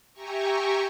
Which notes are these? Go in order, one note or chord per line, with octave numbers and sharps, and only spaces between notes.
G4 E5 G5 G#5 A#5 C#6